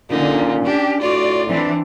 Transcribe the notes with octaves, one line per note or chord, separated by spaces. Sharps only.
A#2 D3 C#4 D#4
D4 G4
A2 F4 F#4 D5
E3 C4 D4 D5